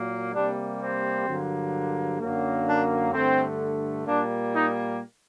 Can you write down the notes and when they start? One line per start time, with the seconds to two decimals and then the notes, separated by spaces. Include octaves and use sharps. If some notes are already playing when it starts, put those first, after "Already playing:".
Already playing: A#2 F#3 A#3
0.33 C3 G3 A#3 D4
0.80 C4
1.26 G2 D3 F#3 A#3
2.20 F#2 D3 F#3 A#3
2.67 D4
3.13 G2 D3 A3 C4
4.06 A#2 G3 A#3 D4
4.53 D#4